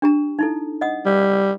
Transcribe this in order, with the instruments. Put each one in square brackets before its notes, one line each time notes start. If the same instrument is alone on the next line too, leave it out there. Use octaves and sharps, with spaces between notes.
[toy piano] D4 G4 A#5
D#4 E4 A4
D#5 F#5 D#6
[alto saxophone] G3